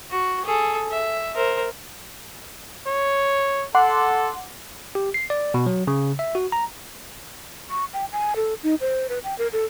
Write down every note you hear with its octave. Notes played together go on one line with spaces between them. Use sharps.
F#4
G#4 A4
E5
A#4 C5
C#5
A4 F#5 C6 D6
G4
C7
D5
B2
F#3
C#3
E5
F#4
A#5
C#6
G5
G#5
A4
D#4
C5
B4
G5
A#4
A4